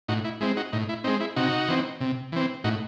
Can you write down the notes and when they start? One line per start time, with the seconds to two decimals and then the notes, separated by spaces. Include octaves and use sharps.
0.08 A2 D#4 F#4
0.24 E4
0.41 G#3 C4 E4
0.57 D#4 F#4
0.73 A2 D#4
0.89 E4
1.04 C4 D#4
1.07 G#3
1.20 E4
1.36 C3 D#4 F#4
1.68 E3 C4
2.00 C3
2.32 E3 C4
2.64 A2 D#4 F#4